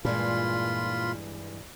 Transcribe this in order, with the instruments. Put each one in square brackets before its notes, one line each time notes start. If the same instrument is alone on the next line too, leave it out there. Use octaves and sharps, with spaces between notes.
[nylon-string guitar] G2 E3 G#3 [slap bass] A#2 [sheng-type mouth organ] F4 B5 C6